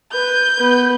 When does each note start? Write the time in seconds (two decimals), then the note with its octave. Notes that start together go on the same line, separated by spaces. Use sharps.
0.13 B4 G6
0.57 B3 B4